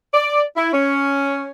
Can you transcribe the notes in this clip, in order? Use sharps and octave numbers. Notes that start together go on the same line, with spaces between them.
D5
E4
C#4